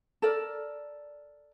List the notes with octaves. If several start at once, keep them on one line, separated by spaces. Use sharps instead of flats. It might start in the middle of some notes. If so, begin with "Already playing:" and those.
A4 A#4 D5